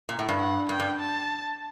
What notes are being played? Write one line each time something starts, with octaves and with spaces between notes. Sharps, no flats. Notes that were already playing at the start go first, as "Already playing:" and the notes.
A#2
A2
G2
F#5
G2 G5
G2
A5